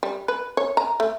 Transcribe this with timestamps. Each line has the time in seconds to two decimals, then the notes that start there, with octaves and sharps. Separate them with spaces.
0.03 G3
0.28 B4
0.57 C#5
0.77 A#5
1.00 A3